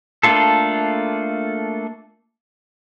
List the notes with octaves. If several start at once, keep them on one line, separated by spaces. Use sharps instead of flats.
A3 A#3 D4 F4 A4